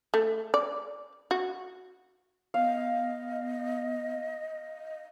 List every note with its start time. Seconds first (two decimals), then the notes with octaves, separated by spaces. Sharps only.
0.14 A3
0.54 D5
1.31 F#4
2.54 B3 D#5 F5